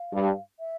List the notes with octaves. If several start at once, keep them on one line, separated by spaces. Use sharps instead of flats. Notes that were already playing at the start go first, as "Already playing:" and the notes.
Already playing: F5
G2
E5